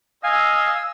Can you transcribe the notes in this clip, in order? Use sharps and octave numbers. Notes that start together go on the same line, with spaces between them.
D#5 F5 G#5 E6